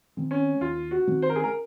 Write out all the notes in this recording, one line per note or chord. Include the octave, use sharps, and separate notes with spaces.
D#3 G#3 C4
C#4
D#2 F4
F#4
D#3 G#3 C4
C5
A#4
G#4
A#4